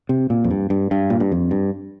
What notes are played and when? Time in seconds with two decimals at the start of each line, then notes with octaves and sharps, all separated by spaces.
0.09 C3
0.30 A#2
0.44 F2
0.51 G2
0.70 G2
0.91 G2
1.10 A#2
1.20 G2
1.32 F2
1.51 G2